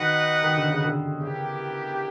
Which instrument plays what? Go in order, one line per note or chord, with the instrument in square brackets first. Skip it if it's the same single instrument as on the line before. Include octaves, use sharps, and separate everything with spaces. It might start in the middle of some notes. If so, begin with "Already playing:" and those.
Already playing: [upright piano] D#3 [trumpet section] D#4 F#4 B4 D#5 F#5
[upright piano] D#3
D3
C#3
D3
[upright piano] C#3 [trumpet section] B3 E4 G4 A#4